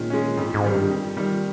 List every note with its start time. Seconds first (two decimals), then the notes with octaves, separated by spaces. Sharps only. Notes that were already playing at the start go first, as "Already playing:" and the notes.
Already playing: A#2 D#3 G#3 C#4
0.10 G#3 C#4
0.37 F2 G#2
0.54 G#2
0.63 D#3 G3
0.73 G2
0.90 F2
1.17 D#3 G3